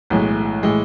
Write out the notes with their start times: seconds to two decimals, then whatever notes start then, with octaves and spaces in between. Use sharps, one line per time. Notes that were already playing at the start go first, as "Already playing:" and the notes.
0.10 B1 A2 E3 G#3
0.63 A2 E3 G#3